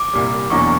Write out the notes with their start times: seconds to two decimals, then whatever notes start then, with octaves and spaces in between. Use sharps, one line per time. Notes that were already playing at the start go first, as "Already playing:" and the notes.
Already playing: D6
0.13 C2 A#2 G3
0.50 E2 B2 F#3 A#3 D4 C#6